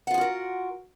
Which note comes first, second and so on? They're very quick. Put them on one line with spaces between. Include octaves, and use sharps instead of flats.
F#5 F4 G#4 F#4 A#4